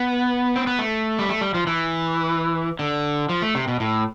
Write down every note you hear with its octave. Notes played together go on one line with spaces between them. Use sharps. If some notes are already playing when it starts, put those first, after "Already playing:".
Already playing: B3
C4
B3
A3
G3
A3
G3
F3
E3
D3
F3
A3
C3
B2
A2